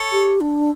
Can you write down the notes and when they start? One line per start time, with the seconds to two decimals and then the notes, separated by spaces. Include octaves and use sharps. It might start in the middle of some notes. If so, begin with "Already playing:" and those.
Already playing: A4 C#5
0.12 G4
0.41 D4